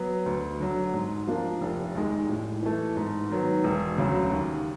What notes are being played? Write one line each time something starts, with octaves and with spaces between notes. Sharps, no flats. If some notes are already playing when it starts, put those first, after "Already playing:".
Already playing: F#3 B3
D2
D3 F#3
G#2
F3 A#3 D4
F1
D#2 D#3 G#3
A2
E3 A3
G#2
D#3 F#3 B3
E1
D2 C#3 F#3
D#2